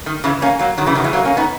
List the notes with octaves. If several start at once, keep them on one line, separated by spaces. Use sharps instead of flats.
D#3
C#3 E3
A#3 C#4
F#3 A#3
D#3 F#3
C#3 E3
D#3 F#3
E3 G#3
F#3 A#3
A#3 C#4
B3 D#4